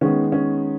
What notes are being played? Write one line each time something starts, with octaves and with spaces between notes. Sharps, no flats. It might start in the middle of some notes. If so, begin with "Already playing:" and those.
D#3 G#3 B3 C#4
C#4